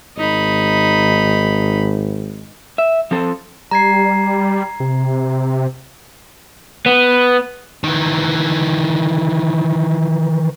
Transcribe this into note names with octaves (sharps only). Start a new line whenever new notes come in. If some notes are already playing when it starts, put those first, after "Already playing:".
G#1 D#4 B5
E5
F3 C4 A4 C5
G3 A#5 G#6 C7
C3
B3
D#3 E3